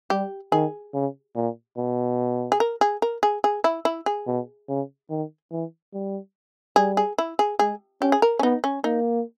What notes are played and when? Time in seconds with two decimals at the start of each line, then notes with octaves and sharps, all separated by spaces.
0.10 G3 G4
0.52 D#3 G#4
0.94 C#3
1.35 A#2
1.77 B2
2.52 G#4
2.60 A#4
2.81 G#4
3.02 A#4
3.23 G#4
3.44 G#4
3.64 E4
3.85 E4
4.06 G#4
4.27 B2
4.69 C#3
5.10 D#3
5.51 E3
5.93 G3
6.76 G3 G#4
6.97 G#4
7.18 E4
7.39 G#4
7.59 G#3 G#4
8.01 C#4 G4
8.12 G#4
8.22 A#4
8.39 C#4
8.43 B3 D#4
8.64 C#4
8.84 A#3 D#4